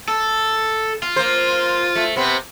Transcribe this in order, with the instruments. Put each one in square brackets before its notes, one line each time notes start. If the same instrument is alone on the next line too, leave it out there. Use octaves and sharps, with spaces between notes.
[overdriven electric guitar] A4
F4
[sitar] A#3 C5
A3
C3 B3 C4